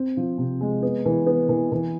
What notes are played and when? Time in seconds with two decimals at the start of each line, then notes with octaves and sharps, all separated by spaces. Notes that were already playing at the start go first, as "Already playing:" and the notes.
Already playing: C4
0.17 F3
0.38 C3
0.61 G#3
0.82 B3
1.06 E3
1.27 B3
1.49 E3
1.72 E3